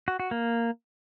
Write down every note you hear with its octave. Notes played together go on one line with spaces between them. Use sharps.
F#4
F#4
A#3